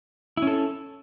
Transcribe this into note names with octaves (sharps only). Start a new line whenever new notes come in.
C#4 E4 A4